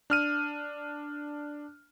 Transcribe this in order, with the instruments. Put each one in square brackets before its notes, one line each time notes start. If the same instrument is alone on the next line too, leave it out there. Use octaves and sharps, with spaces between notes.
[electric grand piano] D4 F6 D#7